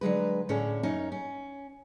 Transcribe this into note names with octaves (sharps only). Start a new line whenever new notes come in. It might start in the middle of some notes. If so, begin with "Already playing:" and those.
D3 F#3 G#3 B4
A2 D3 C#4 G#4
F#2 C#4 D#4
C#4